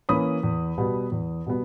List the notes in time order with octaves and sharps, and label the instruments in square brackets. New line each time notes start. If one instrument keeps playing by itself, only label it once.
[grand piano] E3 A#3 C#4 B5 D#6
E2
B2 G3 B3
E2
B2 G3 B3